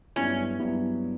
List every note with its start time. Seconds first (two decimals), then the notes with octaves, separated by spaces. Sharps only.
0.16 G2 F#3 B3 C#4 E4
0.59 G2 F#3 B3 E4